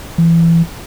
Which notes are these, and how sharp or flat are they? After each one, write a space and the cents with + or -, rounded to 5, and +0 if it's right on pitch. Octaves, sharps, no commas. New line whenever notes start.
E3 +20